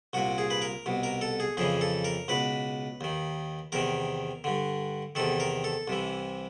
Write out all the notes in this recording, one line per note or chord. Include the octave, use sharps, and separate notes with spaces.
C2 A#2 F#4
G#4
B4
A#4
C2 B2
A#4
A4
G#4
F2 C#3 E3 G#4
A4
A#4
C#2 B2 B4
D#2 D#3
E2 C3 D#3 A#4
G2 D3
E2 C3 D#3 A4
A#4
A4
C2 C3 E3